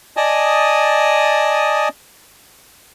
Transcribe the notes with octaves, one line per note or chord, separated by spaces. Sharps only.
D5 D#5 G#5 A5 D#6